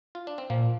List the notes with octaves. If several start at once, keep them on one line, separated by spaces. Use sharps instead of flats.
F4
D4
C4
A#2 F3 A#3